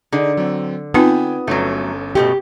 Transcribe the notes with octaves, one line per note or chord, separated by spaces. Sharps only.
D3 D#4 G#4
F#3 C4
B3 C4 D#4 F4 G5 G#5 D#6
G1 F#3 A3 C#4 A4
B2 G#3 A3 G4